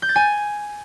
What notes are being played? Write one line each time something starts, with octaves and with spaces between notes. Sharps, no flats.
G6
A6
G#5